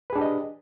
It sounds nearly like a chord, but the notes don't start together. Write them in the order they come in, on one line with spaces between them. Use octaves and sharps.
B4 G#4 D4 G4 D#5